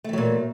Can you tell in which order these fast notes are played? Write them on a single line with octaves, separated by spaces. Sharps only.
A3 E3 F#3 A#2